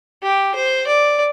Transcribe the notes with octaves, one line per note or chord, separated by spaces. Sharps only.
G4
C5
D5